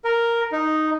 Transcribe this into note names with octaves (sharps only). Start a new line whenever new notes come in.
A#4
D#4